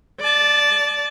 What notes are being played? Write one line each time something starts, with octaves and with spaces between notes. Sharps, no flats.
D5 A5